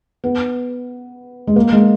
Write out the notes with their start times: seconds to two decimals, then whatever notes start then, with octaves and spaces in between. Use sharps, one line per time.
0.24 B3
1.47 G#3
1.56 A#3
1.72 G#3